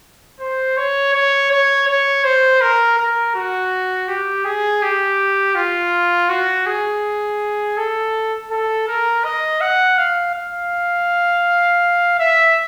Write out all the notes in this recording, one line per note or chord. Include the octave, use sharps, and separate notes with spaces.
C5
C#5
C#5
C#5
C#5
C5
A#4
A#4
F#4
G4
G#4
G4
F4
F#4
G#4
A4
A4
A#4
D#5
F#5
F5
F5
E5